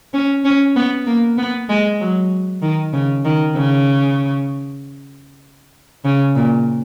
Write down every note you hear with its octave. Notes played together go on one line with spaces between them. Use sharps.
C#4
C#4
B3
A#3
B3
G#3
F#3
D#3
C#3
D#3
C#3
C#3
A#2